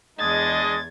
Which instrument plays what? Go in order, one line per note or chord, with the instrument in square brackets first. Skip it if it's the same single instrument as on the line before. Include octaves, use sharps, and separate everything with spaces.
[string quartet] E2 G#6 A6 [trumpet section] G#3 D4 D#5